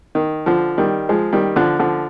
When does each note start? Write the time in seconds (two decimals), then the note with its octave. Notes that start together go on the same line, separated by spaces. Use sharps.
0.15 D#3
0.46 D3 F3
0.78 D#3 G3
1.09 F3 G#3
1.33 D#3 G3
1.56 D3 F3
1.79 D3 F3